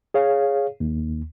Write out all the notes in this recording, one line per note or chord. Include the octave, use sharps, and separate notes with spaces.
G#4 C#5 F5
D#2